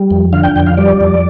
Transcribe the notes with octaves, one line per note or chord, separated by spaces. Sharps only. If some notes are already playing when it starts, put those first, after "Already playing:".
Already playing: G3
F2
D3 F5
G5
F2 G5
F5
G3 D5
F2